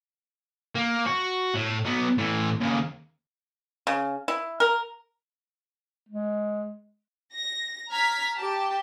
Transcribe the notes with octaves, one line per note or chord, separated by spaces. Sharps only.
A#3
F#4
A2
F#3 B3
A2 E3
D#2 C#3
C#3
E4
A#4
G#3
A#6
A#5 F6 G#6 B6
G4 A5